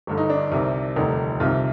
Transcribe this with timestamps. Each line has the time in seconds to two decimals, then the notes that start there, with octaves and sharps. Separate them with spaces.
0.07 G1 G2 D3
0.17 D#4
0.30 D4
0.52 C2 C3 D#3
0.96 F1 D#2 D3 D#4
1.40 C2 C3 D#3 F4